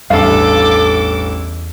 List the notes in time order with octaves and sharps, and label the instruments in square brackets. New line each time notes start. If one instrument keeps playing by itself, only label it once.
[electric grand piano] A1 G2 [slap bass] E2 [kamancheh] A4 D6 [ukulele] F5